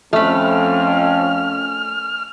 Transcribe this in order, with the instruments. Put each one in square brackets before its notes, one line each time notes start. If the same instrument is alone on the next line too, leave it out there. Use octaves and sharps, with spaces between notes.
[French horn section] F2 [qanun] A3 B5 [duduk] C#4 [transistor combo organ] F6